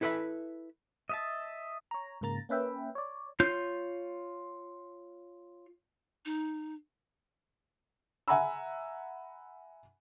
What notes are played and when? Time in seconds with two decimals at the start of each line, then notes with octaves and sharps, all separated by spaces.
0.01 E4 A4 B4 D5 E5 B5
1.09 D#5 E5 A5
1.91 C#5 A#5
2.21 G#2 C#3 A#3 A#5 A6
2.49 A#3 C#4 B4 E5 G5
2.95 C#5 D5
3.40 F4 C#5 G6
6.25 D#4
8.28 E5 F#5 G#5 A#5 B5 E6